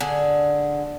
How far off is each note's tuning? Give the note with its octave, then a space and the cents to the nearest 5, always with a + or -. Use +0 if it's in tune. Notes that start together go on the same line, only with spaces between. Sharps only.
D3 +0 G#4 +10